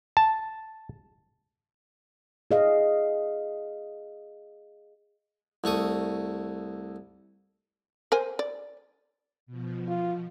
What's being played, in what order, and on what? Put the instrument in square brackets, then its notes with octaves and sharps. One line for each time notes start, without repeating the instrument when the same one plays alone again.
[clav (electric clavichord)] A5
[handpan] G#4 D#5 F5
[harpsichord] C2 A3 C#6 D#6
[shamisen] A#4 C5 G#5
D5
[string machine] B2 F3
[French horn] F4